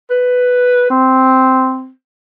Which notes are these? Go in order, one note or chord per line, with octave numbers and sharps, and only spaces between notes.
B4
C4